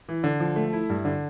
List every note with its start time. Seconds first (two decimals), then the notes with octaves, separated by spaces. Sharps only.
0.09 E3
0.24 D3
0.40 F3
0.56 A3
0.73 E4
0.90 G2
1.05 D3